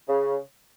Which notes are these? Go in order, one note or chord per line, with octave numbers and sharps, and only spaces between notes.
C#3